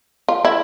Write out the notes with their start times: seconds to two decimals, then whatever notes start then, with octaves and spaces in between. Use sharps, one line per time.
0.29 F4
0.45 E4